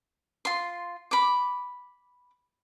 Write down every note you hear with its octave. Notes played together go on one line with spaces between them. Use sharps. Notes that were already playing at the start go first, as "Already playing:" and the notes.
F4 C6
B5 D6